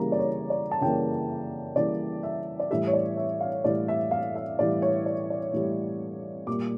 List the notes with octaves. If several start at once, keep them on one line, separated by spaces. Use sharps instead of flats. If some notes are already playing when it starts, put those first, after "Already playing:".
Already playing: C#3 E3 G3 A#3 A#5
D5
C#5
D5
A5
C#3 E3 G3 A#3 G5
C#3 E3 G3 A#3 D5
E5
D5
A2 E3 G3 E5
C#5
D5
E5
F5
A2 E3 G3 D5
E5
F5
E5
A2 E3 G3 D5
C#5
D5
D5
A2 E3 G3
A#2 G3 A#3 D6